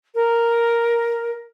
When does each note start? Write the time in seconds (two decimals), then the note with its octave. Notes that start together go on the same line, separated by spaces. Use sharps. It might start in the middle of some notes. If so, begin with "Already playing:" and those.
0.14 A#4